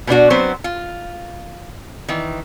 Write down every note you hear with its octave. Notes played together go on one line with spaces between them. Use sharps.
B2 B3 D4 F#4
F#3 B3 C4 C5
F4
D#3 E3